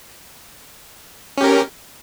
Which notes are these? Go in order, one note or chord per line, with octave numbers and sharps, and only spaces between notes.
C#4 G4 A#4